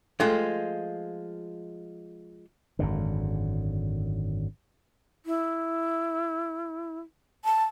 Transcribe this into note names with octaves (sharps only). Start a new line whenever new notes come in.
F3 G#3 A3 F4 A4
G#1 F#2 D3
E4
A5